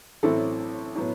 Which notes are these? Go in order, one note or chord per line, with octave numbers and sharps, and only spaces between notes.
A1 A2 F#3 C4 E4 A4
A2 F#3 B3